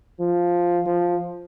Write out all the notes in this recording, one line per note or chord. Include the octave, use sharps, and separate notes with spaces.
F3
F3